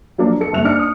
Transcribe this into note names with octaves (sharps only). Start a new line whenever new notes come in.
F3 F#3 A#3 D4
A4 C#7
F#1 G2 E5 F#6 F7
D4 D#4 F6 C#7
D#6